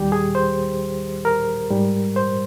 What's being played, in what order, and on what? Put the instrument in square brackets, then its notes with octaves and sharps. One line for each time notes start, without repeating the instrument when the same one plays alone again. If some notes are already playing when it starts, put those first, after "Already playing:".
Already playing: [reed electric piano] D#2 D#3 G3 G4
G#4
C5
A#4
G#2 G3
C5